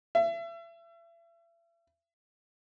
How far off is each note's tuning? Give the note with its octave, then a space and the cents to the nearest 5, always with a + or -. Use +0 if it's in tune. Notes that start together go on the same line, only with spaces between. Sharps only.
E5 +35